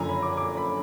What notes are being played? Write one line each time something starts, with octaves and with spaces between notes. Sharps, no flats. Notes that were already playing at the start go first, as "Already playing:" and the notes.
Already playing: F#1 F#2 D3 F3 G#5 A#5
B5
D6
D6
B5